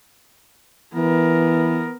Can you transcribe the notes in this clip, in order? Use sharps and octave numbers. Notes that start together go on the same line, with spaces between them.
E3 B3 A#4